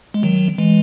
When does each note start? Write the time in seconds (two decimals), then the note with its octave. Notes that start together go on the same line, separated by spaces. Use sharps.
0.14 G#3
0.23 D#3 F#3
0.58 E3 G#3